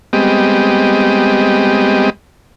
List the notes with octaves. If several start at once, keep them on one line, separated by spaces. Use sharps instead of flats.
G3 G#3 B3 C4 G4 D#5